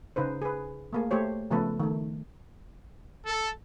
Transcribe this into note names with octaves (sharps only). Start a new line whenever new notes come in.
C#3 D#4 B4 C5
G#4 B4
A3 A#3 G#4
A3 G4 C5 C#5
C#3 F3 A3 B3 A4 B4
D#3 A3
A4